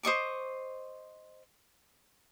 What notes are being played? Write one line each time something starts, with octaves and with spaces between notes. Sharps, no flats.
C5 D#5 C#6 D6